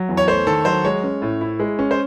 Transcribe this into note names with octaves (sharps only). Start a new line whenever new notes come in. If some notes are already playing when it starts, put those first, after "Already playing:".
Already playing: F#3
E2
C#5
A3 C5
D#3 A4
F#3 C5
G#3 C#5
C#4
A2
E4
G#3
C#4
C5